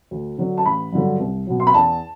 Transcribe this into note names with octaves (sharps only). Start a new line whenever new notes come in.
D2
D3 F#3
A5
A1 B5
G2 D3 F#3
C2
B2 F#3
C6
B5
E2 A5